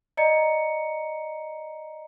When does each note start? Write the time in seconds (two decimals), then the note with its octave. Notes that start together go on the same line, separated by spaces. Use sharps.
0.17 D5 D#5 A#5 C#7